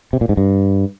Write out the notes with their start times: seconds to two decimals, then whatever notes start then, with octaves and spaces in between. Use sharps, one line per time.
0.13 C3
0.21 A#2
0.29 G#2
0.37 G2